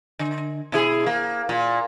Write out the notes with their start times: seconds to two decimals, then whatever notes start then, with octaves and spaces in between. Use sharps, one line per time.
0.19 D3
0.72 B2 E4 G#4
1.06 A#3
1.49 A#2